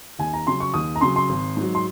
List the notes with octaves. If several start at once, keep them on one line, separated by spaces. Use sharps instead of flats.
D#2 G#5
A#5
C#3 F#3 C6
C#6
D#2 D#6
A#5
C#3 F#3 C6
C6
G#1
G#2 F#3
C6